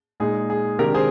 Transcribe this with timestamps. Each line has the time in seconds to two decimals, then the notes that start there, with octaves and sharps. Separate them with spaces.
0.20 A#2 G#3 D#4 G#4
0.50 G#4
0.79 C3 D#3 G#3 D4 G4 A#4
0.94 G#4 C5